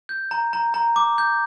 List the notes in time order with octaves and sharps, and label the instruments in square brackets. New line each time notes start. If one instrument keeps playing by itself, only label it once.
[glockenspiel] G6
A#5
A#5
A#5
D6
G6